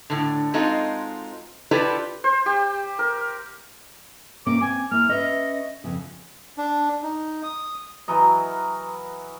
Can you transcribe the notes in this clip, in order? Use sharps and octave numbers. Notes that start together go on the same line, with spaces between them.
A2 D3
G#3 C4 D#4 F4 F#4 A4
E4 F4 G4 A4 B4 D5
C5
G4
A#4
C3 A#3 C#4 D6
C4 G#5
A#3 E4 F6
C#4 B4 D#5 E5
F2 C#3
D4
D#4
D#6
E3 F#3 A#4 D#5